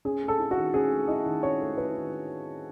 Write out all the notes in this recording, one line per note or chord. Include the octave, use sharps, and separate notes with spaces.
C#4 G#4
A3
A4
E4
F#4
D#3
C#4 G#4
A3
E4 D#5
D#3
C#4 C#5
A3
E4 B4
D#3